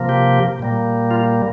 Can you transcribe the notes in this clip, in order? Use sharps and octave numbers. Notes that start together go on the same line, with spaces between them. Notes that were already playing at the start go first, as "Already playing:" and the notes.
Already playing: C3 F3 A#3
G4
A#2 G3 A#3
F4